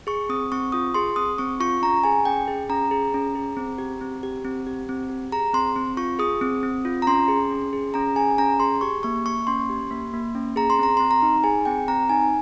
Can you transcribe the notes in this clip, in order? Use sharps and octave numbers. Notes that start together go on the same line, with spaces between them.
G#4 C#6
C4 D#6
C4 C#6
F4 D#6
G#4 C6
C4 D#6
C4 C#6
F4 C#6
C#4 A#5
G#4 G#5
C#4 G5
G#4
C#4 A#5
G#4
C#4
G#4
C4
G4
C4
G4
C4
G4
C4
G4
G#4 A#5
C4 C6
C4
F4 C#6
G#4 D#6
C4
C4
F4
A#5
C#4 C6
G#4
C#4
G#4
C#4 A#5
G#4 G#5
C#4 A#5
G#4 C6
G4 C#6
A#3 C#6
A#3 C#6
C#4 C6
G4
A#3
A#3
C#4
G#4 A#5
C6
C4 A#5
C4 C6
A#5
D#4
G#4 G#5
C4 G5
C4 A#5
D#4 G#5